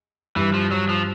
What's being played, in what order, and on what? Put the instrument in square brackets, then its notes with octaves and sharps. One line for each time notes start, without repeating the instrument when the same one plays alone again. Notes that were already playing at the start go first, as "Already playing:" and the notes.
[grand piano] G2 [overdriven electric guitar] E3
[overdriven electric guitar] F3
F#3
F3